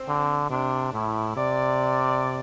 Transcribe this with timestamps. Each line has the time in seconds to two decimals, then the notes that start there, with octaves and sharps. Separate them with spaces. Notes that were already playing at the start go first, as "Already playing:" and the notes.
Already playing: C4
0.08 D3
0.50 C3 D4
0.93 A2 E4
1.36 C3 D5